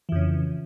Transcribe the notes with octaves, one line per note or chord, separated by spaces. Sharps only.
F2 C#3 E3